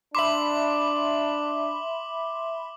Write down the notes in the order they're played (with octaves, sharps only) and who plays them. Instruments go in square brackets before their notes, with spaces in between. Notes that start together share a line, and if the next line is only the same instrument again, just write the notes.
[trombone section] D4 [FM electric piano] E5 B5 C6 [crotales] D6 F#7